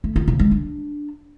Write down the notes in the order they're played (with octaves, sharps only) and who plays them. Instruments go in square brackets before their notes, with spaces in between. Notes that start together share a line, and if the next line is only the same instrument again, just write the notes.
[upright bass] A3
F4
C#3
G#3
D4